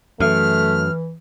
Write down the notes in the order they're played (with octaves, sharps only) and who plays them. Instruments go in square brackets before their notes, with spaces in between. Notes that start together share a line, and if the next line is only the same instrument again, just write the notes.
[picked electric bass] F#2 [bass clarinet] E3 [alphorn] A3 [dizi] F6